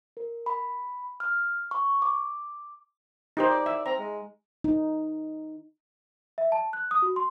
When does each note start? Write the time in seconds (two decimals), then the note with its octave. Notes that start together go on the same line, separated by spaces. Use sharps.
0.17 A#4
0.46 B5
1.20 F6
1.71 C#6
2.02 D6
3.37 D#4 G4 C5
3.50 D5
3.66 E5
3.86 C4 A#5
3.99 G#3
4.64 D#4
6.38 E5
6.52 A5
6.73 F#6
6.91 D#6
7.02 F#4
7.16 C6